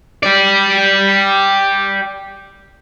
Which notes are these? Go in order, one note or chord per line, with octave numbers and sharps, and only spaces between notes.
G4 D5